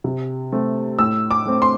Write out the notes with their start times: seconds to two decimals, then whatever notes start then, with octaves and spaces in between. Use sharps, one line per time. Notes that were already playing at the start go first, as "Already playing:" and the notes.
0.04 C3
0.52 A3 C4
0.99 A2 E6
1.31 D6
1.46 A3 C4
1.62 C6